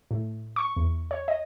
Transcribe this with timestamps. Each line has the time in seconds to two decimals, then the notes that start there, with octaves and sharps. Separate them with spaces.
0.11 A2
0.56 C#6
0.76 E2
1.11 C#5
1.28 D#5